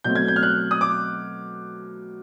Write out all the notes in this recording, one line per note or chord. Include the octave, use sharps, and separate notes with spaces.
B2 F#3 A3 C4 G6
G#6
G6
F6
F#6
D#6
D6